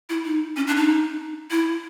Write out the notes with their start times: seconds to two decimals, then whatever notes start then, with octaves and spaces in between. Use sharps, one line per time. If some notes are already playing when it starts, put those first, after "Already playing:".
0.09 E4
0.25 D#4
0.56 C#4
0.67 D4
0.77 D#4
1.51 E4